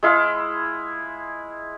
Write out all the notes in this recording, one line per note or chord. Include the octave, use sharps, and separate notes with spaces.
G#3 E4 F5